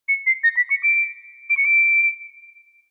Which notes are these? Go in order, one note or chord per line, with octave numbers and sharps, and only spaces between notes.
C#7
C7
A#6
B6
C#7
D7
D7
C#7
D7